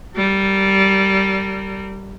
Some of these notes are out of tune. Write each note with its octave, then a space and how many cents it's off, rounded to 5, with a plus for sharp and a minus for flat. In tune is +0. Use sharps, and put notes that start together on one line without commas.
G3 -15 A#4 -35